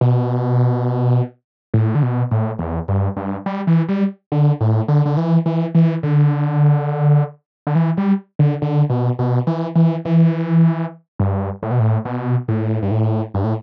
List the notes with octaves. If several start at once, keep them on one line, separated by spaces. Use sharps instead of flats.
B2
A2
D3
B2
A2
E2
G2
G2
G3
E3
G3
D3
A2
D3
D3
E3
E3
E3
D3
D3
E3
G3
D3
D3
B2
B2
E3
E3
E3
G2
A2
B2
A2
B2
A2
G2
A2
G2
A2